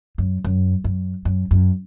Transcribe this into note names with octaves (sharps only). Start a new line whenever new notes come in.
F#2
F#2
F#2
F#2
F#2